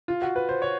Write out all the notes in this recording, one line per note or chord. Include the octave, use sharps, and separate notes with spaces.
F4
F#4
B4
C5
C#5